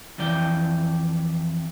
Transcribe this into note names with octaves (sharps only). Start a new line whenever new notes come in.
F2 E3 D5 G5